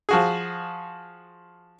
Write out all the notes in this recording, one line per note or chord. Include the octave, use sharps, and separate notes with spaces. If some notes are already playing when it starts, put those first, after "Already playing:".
F3 F#4 G#4